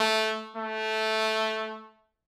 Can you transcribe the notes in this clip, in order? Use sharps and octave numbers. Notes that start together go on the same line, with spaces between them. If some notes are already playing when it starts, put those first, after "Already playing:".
Already playing: A3
A3